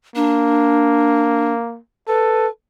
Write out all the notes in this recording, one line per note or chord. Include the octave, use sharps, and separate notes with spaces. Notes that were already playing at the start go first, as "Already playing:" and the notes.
A#3 D4
A4 B4